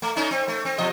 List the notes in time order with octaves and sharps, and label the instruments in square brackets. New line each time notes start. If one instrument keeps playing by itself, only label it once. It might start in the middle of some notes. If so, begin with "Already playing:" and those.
[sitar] A3
A3 C#4 D#4
C4
A3
C4
B2 F3 D#5